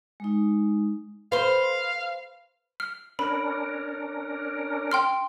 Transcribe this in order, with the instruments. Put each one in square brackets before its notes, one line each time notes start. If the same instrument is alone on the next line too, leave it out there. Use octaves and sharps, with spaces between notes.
[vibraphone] G#3 D#4
[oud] B4 C5 [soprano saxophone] F5
[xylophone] F6
[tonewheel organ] C#4 D4 A#4 [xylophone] B5
[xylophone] G5 C6 F6